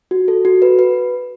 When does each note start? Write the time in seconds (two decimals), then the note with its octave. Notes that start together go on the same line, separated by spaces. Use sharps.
0.11 F#4
0.28 A4
0.45 F#4
0.62 B4
0.79 B4